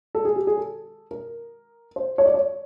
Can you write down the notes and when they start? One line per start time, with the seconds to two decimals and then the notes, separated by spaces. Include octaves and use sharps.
0.15 A4
0.25 G#4
0.36 G4
0.47 G#4
0.57 A4
1.11 A#4
1.96 C5
2.18 C#5
2.26 D5
2.34 C#5